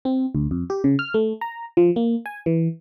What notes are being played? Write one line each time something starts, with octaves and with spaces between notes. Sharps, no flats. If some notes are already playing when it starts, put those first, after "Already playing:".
C4
D2
F2
G4
C#3
F6
A3
A#5
F3
A#3
G#5
E3